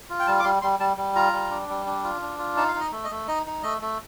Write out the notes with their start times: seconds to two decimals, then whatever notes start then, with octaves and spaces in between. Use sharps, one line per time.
0.10 F4
0.20 G5
0.27 G3 A5
0.40 D6
0.44 G3 C6
0.62 G3 C6
0.79 G3 A5
0.97 G3
1.16 F4 A#5
1.32 G3
1.50 D4
1.69 G3
1.86 D4
2.04 F4
2.22 D4
2.39 F4
2.56 D#4 A5
2.68 F5
2.75 D#4
2.80 D#5
2.92 A3
3.04 D#5
3.11 A3
3.28 D#4 D#5
3.46 D#4
3.63 A3 D#5
3.82 A3